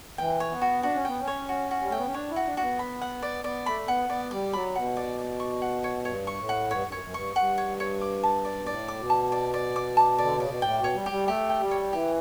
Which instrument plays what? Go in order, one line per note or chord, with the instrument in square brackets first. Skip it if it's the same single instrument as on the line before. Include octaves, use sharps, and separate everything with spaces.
[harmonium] E3 [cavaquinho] G5
[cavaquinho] C#5
[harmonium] B3
[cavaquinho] F#4
[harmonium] D4 [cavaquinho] F#4
[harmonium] C#4
[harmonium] B3 [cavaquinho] G5
[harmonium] C#4
[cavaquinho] C#5
F#4
F#4
[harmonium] G3
[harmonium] A3 [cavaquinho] G5
[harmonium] B3
C#4
[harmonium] D4 [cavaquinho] C#5
[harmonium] E4
[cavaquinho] F#4
[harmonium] D4
[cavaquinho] F#4
[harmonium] B3
[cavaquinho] B5
F#5
D5
[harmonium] B3 [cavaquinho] D5
[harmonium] A3 [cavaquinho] B5
[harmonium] B3 [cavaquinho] F#5
[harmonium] B3 [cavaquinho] D5
[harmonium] G3 [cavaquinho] D5
[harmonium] F#3 [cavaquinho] B5
[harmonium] B2 [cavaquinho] F#5
[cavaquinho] D5
D5
C#6
F#5
C#5
[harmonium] G2 [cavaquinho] C#5
[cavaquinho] C#6
[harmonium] A2
[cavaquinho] F#5
[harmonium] G2 [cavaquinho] C#5
[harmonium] G2
[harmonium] F#2 [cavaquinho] C#5
[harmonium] F#2
[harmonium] G2 [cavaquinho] C#6
[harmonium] G2 [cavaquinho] F#5
[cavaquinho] C#5
C#5
D6
A5
D5
[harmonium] B2
[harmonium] A2 [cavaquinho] D5
[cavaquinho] D6
[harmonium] B2
[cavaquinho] A5
D5
D5
D6
A5
[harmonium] D3 [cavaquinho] D5
[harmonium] C#3 [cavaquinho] D5
[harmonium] B2
[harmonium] A2 [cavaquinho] G5
[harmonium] B2
[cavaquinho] C#5
[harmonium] G3
[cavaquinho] G4
[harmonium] G3
[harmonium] A3 [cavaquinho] G4
[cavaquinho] G5
[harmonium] G3
[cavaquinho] C#5
[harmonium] E3 [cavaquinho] G4